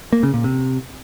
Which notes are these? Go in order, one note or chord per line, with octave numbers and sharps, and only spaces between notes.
A#3
C#3
A#2
C3